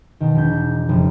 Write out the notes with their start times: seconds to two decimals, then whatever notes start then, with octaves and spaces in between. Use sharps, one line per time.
0.20 B2 D#3
0.35 E1 G6
0.89 F1 C#3